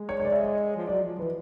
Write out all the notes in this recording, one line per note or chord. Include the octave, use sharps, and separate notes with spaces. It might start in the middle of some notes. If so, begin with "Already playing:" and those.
Already playing: G#3
C#5
C#5
D5
E5
D#5
F3
F#3 D5
F3
E3 B4